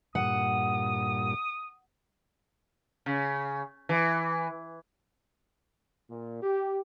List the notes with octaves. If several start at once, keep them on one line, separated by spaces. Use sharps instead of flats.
G2 A#2 F#5 D#6
C#3
E3
A#2
G4